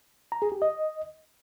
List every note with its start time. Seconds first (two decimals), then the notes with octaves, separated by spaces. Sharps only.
0.32 A#5
0.42 G#4
0.52 G4
0.62 D#5